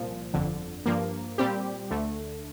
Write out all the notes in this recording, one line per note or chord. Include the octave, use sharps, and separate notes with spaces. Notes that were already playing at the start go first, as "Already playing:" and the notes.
Already playing: C2 A#2 F3
G1 F2 D3
G2 F3 A#3
A#2 G3 C4 G4
D2 D3 A3